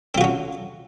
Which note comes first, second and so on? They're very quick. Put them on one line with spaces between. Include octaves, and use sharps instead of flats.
C4 F4 F#4 C#4